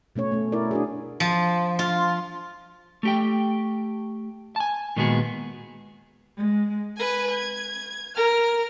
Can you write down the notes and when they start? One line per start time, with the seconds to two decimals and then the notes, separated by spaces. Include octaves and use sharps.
0.16 B2 A3 C#4 C#5
0.32 A3 C#4
0.52 E4 A#4 D5
0.71 D4 F#4 G#4
1.20 F3
1.79 F4
3.03 A3 G4 G5
4.56 G#5 A5
4.96 A#2 D#3 G#3 B3 F#4 G#4
6.36 G#3
6.96 B4 G#5
7.31 G#6
8.16 A#4 F6